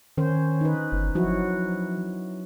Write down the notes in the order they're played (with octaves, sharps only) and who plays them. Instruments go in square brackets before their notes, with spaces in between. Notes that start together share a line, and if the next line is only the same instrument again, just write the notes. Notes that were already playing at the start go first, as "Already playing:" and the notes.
[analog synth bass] D#3 [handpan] C#4 C5
[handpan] D#4 B4
[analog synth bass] G1
[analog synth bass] F3 [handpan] F#3 E4 F#4